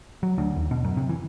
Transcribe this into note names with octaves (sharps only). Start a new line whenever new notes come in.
F#3
D2
D#2
B2
F#2
C3
E3